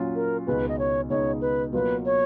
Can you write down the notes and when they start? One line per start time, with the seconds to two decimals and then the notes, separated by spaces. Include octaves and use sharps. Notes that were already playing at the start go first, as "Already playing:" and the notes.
Already playing: A#2 F#3 C#4 F4
0.15 A#4
0.47 C#2 B2 G#3 D#4 B4
0.68 D#5
0.79 C#5
1.10 C#2 B2 G#3 D#4 C#5
1.41 B4
1.73 B2 F#3 A#3 F4 B4
2.05 C#5